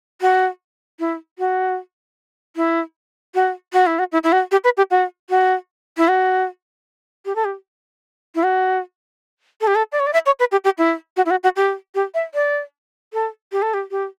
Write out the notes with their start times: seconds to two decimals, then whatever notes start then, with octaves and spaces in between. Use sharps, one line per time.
0.21 F#4
1.00 E4
1.39 F#4
2.56 E4
3.35 F#4
3.73 F#4
3.87 E4
3.99 F#4
4.12 E4
4.24 E4
4.32 F#4
4.52 G4
4.64 B4
4.77 G4
4.91 F#4
5.30 F#4
5.98 E4
6.08 F#4
7.25 G4
7.36 A4
7.45 G4
8.35 E4
8.43 F#4
9.61 A4
9.67 G4
9.75 A4
9.92 D5
10.00 C#5
10.07 D5
10.13 E5
10.26 C#5
10.39 B4
10.52 G4
10.64 G4
10.78 E4
11.17 F#4
11.26 E4
11.31 F#4
11.43 F#4
11.56 G4
11.95 G4
12.14 E5
12.35 D5
13.13 A4
13.52 G4
13.62 A4
13.74 G4
13.91 G4